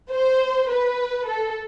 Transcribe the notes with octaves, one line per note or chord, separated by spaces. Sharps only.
C5
B4
A4